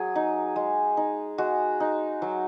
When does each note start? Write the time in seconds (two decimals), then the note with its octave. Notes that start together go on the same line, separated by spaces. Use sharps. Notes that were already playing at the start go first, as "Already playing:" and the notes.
Already playing: F#3 G#4
0.15 D#4
0.56 G#3
0.97 D#4
1.38 G#3 F#4
1.80 D#4
2.22 F#3